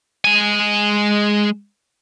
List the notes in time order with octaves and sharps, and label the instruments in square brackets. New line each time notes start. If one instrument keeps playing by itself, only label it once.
[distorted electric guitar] G#3 G#5